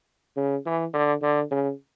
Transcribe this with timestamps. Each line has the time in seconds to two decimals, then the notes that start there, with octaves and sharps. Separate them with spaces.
0.37 C#3
0.66 E3
0.94 D3
1.23 D3
1.51 C#3